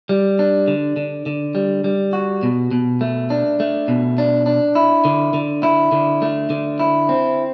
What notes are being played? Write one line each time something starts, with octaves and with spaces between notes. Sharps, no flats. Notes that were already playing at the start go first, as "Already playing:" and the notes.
G3
D4
D3
D3
D3
G3
G3
F#4
B2
B2
A3
D4
A3
B2
D4
D4
E4
D3
D3
E4
D3
A3
D3
E4
C4